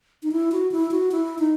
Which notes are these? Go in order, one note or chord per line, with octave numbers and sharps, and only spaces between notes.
D#4
E4
F#4
E4
F#4
E4
D#4